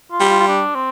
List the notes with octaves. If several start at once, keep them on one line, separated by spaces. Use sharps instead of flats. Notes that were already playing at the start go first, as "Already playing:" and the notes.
F4
G3
F4
F4
D4
C4